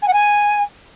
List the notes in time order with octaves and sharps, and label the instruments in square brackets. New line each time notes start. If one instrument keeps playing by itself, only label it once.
[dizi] G#5
F#5
G#5